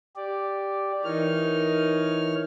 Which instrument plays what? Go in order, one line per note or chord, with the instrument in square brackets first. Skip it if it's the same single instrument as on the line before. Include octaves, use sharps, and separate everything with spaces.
[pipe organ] G4 D5
[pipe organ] E3 C#5 F6 [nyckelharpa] D#4 A#4